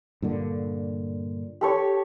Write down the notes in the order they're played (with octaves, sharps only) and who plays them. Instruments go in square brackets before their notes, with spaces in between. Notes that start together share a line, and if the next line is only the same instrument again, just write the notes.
[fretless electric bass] G2 A#2 D3
[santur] G4 A4 C#5